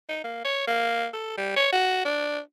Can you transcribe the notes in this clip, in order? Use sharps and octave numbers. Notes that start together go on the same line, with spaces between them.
D#4
A#3
C#5
A#3
A4
G3
C#5
F#4
D4